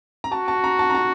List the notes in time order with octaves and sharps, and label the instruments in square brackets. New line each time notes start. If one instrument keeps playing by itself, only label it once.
[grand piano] A#5
[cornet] F#4 [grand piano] A5
[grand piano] A5
A#5
A5
A#5
A5